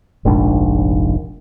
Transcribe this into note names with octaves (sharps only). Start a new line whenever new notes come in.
F1 A#1 G#2 D4